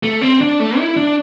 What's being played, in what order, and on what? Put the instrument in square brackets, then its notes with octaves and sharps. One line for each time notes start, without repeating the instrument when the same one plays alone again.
[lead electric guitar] A3
C4
D4
A3
E4
D4